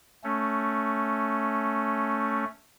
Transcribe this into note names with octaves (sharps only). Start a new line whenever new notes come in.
A3 C#4